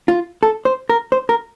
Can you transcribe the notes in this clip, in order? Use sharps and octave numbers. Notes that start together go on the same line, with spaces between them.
F4
A4
C5
A#4
C5
A#4